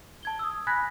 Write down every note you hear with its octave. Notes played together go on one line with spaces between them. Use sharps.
A5 G#6 G7
D#6 E6
G#5 B5 F#6 G#6 A#6 B6